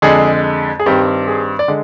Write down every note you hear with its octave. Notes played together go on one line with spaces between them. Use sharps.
F2 D3 G#3 G#4
G#4
G2 D#3 G3 C4 G4
G#4
D5
D3 G#3